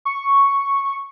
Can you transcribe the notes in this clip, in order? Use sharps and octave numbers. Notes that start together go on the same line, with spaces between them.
C#6